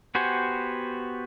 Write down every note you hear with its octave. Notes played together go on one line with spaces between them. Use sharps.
B3 F#4 G4 C5 G#5